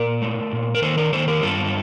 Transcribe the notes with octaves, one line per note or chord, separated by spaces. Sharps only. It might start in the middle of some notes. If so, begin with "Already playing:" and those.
Already playing: A#2 A#4 D5
A3
A#2
A#4
D#3 A4 C5
A#4 D5
D#3 A4 C5
G4 A#4
G2 F4 A4